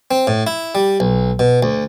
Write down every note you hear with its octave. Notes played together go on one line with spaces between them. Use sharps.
C4
A2
E4
G3
B1
B2
D2